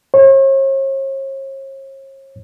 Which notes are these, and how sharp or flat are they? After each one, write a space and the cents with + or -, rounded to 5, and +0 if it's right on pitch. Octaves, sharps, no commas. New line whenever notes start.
C#5 -45